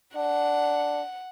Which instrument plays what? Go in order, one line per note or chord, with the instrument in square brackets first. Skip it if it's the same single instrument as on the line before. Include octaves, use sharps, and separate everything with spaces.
[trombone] D4 [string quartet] F#5